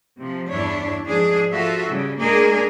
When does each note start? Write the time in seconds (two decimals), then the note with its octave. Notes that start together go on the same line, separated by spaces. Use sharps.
0.18 C3 F3
0.49 E2 G2 D4 E4 C#5
1.08 G#2 F3 D4 G#4
1.52 F3 F4 F#4 A4 E5
1.89 C#3 G3
2.20 G#3 A#3 D4 G#4 A#4